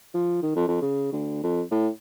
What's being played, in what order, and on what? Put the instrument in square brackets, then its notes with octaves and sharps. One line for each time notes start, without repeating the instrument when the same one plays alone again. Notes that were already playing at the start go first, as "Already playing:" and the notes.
[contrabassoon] F3
D#3
F2
F2
C#3
D2
F2
A2